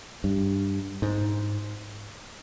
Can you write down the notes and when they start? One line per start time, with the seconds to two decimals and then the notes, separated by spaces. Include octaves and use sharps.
0.24 G2
1.02 G#2